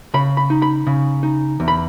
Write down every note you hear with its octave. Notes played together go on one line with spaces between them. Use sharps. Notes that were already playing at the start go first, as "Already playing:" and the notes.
C#3 B5
B5
D#4
B5
C#3
D#4
E2
B5